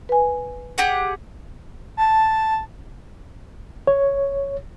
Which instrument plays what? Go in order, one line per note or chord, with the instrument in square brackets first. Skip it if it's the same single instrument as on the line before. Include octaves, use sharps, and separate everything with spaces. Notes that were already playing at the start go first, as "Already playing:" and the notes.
[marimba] B4 G#5
[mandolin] G4 G#4 F#5
[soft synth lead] A5
[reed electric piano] C#5